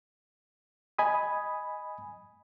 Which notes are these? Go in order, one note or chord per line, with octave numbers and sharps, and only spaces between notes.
D#5 G#5 B5 D#6